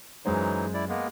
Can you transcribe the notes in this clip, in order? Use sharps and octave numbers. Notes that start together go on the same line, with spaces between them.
F#2 E3 F#3 G#3 D#4 C5
E4 D5
G#3 A#3 B3